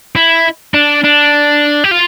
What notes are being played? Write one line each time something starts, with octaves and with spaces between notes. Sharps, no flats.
E4
D4
D4
G4
F4